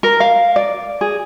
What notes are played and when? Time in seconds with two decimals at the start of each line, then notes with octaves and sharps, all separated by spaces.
0.03 A#4
0.20 F5
0.56 D5
1.01 G#4